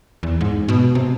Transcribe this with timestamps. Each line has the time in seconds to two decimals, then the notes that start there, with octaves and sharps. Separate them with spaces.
0.23 E2
0.41 G#2
0.68 B2
0.95 C3